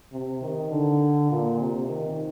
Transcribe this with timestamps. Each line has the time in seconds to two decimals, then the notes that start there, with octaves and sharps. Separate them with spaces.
0.12 C3
0.42 D#3
0.71 D3
1.30 A#2
1.60 C3
1.89 D#3